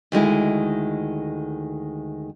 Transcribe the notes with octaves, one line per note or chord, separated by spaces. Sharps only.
D2 D#3 G#3 E4